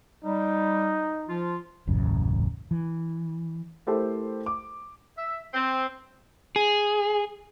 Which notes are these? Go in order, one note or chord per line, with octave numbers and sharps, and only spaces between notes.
G3 D#4
F3 F4
D#1 A1 F#2 C#3
E3
A3 E4 G4 A4 A#4 C5
D6
E5
C4
G#4